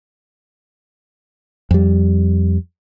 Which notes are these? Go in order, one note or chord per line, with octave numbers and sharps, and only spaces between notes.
F2 G3